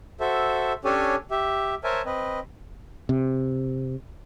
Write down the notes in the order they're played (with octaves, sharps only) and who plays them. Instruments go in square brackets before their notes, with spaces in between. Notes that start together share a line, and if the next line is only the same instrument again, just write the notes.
[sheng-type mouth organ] F#4 A4 C5 E5
C#4 D4 G4 A4 C#5 G#5
G4 E5
A#4 C5 C#5 E5 G#5 A5
C4 B4 D#5
[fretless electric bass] C3